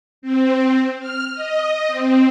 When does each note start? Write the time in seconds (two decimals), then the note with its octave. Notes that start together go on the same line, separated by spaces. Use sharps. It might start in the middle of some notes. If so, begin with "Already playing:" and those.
0.22 C4
1.00 F6
1.34 D#5
1.87 C4